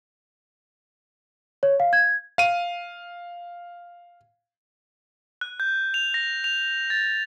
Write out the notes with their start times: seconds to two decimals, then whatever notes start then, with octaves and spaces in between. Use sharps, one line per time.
1.63 C#5
1.80 F5
1.93 G#6
2.38 F5 D#7
5.41 F#6
5.60 G6
5.94 F7
6.14 A#6
6.44 F7
6.90 A6